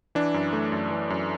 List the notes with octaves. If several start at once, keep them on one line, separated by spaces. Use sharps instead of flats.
E3 D4
F#2
A3
F#2
E3
F#2